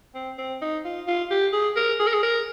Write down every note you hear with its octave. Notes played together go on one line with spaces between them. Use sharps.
C4
C4
D#4
F4
F4
G4
G#4
A#4
G#4
A#4
G#4
A#4